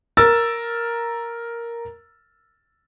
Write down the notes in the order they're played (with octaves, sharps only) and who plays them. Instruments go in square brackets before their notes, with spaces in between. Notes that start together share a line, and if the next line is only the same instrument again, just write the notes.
[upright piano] A#4 E6 A6